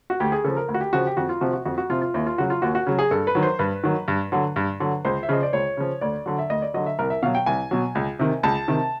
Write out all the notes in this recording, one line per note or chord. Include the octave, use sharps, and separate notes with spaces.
F#4
D2 G4
G#4
C#3 F3 A4
A#4
D2
F#4
G4
C#3 F3 F#4
G4
F2 F#4
F4
C3 F3 F#4
F#4
F2 F#4
F#4
C3 F3 F4
F4
D#2 E4
F4
C#3 F#3 F#4
F4
D#2 F#4
F#4
C#3 F#3
G#4
G2 A4
B4
D#3 F#3
C5
G2 B4
D#3 F#3
G2
D3 F#3
G2
D3 F#3
C#2 C5
E5
C#3 F3 D#5
D5
C#2 C#5
C#3 F3
D2 D5
D3 F#3
E5
D2 D#5
D5
D3 F#3 D#5
E5
C2 A#4
E5
B2 F#3 F5
G5
C2 G#5
B2 F#3
C#2
C3 D#3
C#2 A5
C3 D#3